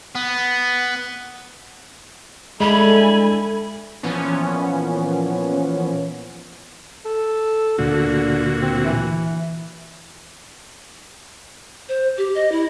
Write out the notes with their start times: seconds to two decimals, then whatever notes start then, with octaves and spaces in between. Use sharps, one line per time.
0.15 B3
2.60 D3 G#3 E4 A4 G#5 B5
4.03 A#2 E3 F3 B3 C#4
7.05 A4
7.78 D2 A#2 D3 F#4
8.62 C4
8.85 E3
11.89 C5
12.18 G4
12.35 D#5
12.52 E4